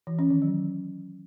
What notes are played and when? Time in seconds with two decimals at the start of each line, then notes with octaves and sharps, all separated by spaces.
0.07 E3
0.19 C#4
0.30 D#3
0.42 F#3